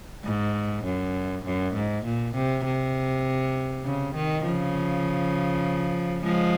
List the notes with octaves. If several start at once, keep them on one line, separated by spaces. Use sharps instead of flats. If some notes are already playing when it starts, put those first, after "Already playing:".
G#2
F#2
F#2
G#2
A#2
C3
C3
C#3
D#3
C#3 F3
F3 G#3